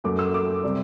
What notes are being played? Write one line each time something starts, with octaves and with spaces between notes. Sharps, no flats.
F#2 F#3 A3 D6
E6
D6
C3 G3